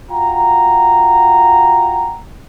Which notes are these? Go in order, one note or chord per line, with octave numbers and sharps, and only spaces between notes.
F4 F#4 F#5 G5 A#5